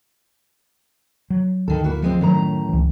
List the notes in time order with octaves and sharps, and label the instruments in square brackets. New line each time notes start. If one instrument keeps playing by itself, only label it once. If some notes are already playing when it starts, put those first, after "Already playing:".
[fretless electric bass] F#3
[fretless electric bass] D2 [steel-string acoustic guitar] D#3 A4
[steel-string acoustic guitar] A#3 E4 F#4
F3 G#3 C4
[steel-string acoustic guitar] F#2 A2 A#5 [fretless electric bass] D#3
[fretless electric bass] C#2 E3